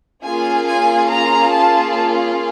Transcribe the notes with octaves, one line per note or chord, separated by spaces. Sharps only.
A#3 C#4 F4 G#4 G#5
G#5
A#5
A5